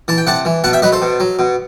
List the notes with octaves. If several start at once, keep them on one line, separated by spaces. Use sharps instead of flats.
E3 A5
G5
C3 F#5 A5
E3
B2 F#5 A5
E5 G5
F#3 B4 D#5
A4 C5
B2
F#3
B2